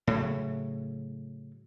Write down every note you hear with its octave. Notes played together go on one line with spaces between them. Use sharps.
A2 C#3 F#3